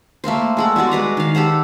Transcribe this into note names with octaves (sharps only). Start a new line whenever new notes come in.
A3 A#3 A#4 C5
G#3 A4 F#5
G3 B3 F#4 D5
G#3 B4 A#5
D#3 F5
G4 A4 C5 F#5